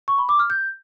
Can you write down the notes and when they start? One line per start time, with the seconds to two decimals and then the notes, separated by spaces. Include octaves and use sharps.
0.08 C#6
0.18 B5
0.29 D6
0.39 F6
0.50 G6